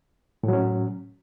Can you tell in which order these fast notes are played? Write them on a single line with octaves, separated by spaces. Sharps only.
A2 F#3 C#4